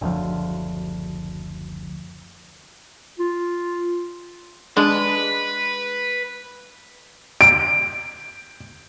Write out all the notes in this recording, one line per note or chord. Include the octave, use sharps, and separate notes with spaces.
F#1 D2 F3
F4
G#3 D4 B4
D7